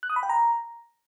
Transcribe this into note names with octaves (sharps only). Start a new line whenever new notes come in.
F#6
D#6
B5
G5
A#5